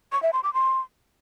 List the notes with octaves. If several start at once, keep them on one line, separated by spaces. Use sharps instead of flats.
C#6
E5
C6
D6
C6